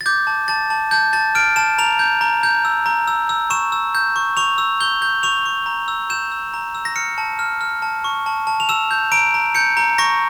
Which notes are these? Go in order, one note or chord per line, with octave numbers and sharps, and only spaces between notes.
A6
D6 G6
A5
A5 A6
A5
A5 G6
A5 A6
F6 D7
A5 E7
A#5 F7
G6
A#5
G6
E6
A#5
E6
E6
C#6 E7
E6
G6
C#6
C#6 F7
E6
G6 G7
G6
C#6 F7
C#6
A#5
E6
G6 E7
E6
A#5
E6
A#6
F6 C#7
A5
F6
F6
A5
C#6
A5
A5
F7
E6 E7
G6
A#5 D7
A#5
G6 C#7
A#5
C#6 A#6